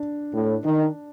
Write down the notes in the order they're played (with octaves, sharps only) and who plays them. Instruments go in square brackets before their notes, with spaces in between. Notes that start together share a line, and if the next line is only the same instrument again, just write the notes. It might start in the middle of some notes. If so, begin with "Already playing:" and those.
Already playing: [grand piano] D4
[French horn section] A2
D#3